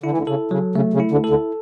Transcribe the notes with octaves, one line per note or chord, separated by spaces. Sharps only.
D3 E4
E3
D2 D3
C#3 A4
C#3 F#3
C#3 A3
C#3
E4
D2 D3
A4
D2 D3